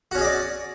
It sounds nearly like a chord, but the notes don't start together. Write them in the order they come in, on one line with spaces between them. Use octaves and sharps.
F#4 C#4 G#4 D#5 D5